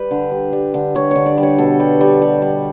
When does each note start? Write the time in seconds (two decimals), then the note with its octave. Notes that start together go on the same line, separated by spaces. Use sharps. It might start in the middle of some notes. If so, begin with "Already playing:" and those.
Already playing: G3 G4 B4
0.11 D3
0.31 G3
0.53 G3
0.74 D3
0.95 G3 C#5
1.11 D3 C#5
1.26 D5
1.38 G3
1.43 C#5
1.58 B2 A4
1.80 G3
2.01 G3
2.22 G3
2.42 G3